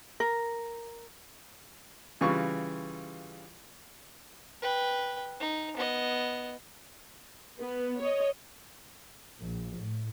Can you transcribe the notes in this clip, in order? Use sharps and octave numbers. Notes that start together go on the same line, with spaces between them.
A#4
C#3 E3 G3 F4 C#6
B4 G5
D#4
B3 D#5
B3
C#5 D#5
A#1
A2